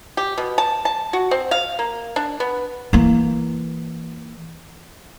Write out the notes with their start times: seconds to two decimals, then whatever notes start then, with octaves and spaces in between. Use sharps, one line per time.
0.17 G4
0.38 B2
0.58 A5
0.85 A5
1.13 F#4
1.31 C4
1.51 F5
1.79 A#3
2.16 D4
2.40 B3
2.93 E3 A#3